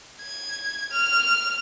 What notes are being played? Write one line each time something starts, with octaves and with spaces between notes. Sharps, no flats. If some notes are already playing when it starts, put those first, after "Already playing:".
G#6
F6